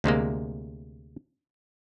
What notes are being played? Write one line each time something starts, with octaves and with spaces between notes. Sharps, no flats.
D2 C3 G#3 A#3